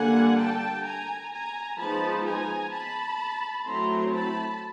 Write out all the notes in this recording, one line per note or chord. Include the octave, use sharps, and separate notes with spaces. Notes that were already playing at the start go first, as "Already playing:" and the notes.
Already playing: D3 G3 A#3 F#5 G#5
G5 A5
G#5 A#5
G#5 A#5
F3 G#3 B3 D#4 A5 B5
G#5 A#5
A5 B5
F#3 A3 C4 E4 A#5 C6
A5 B5